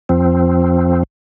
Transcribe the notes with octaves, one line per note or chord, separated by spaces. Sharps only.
F2 F3 C4